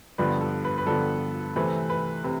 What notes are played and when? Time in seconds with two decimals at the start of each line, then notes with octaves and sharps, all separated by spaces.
0.18 G2 D3 F3 B3 B4
0.41 A4
0.65 B4
0.78 B4
0.87 G2 D3 F3 B3 A4
1.56 C3 E3 A3 C4 B4
1.90 B4
2.24 C3 B4